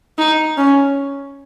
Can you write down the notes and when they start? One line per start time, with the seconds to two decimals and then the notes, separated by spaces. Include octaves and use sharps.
0.18 D#4
0.57 C#4